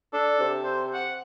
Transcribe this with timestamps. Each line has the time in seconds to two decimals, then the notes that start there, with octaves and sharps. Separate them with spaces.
0.13 D4 A4
0.40 C3
0.64 C5
0.94 F#5